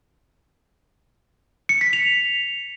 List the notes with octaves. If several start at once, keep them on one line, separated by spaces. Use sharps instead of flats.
C#7
B6
F7